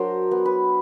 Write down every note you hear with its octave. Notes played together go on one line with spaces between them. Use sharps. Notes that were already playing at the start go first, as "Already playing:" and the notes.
Already playing: F#3 D4 A#4 C5
B3
B4